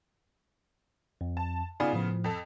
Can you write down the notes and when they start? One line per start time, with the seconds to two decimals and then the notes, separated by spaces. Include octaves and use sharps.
1.21 F2
1.37 A5
1.80 C#3 B3 D#4 F4 D5 G#5
1.93 A2 F3
2.24 F2 A4